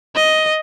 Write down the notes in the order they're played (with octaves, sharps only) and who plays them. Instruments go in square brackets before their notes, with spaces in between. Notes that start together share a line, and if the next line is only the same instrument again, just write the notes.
[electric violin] D#5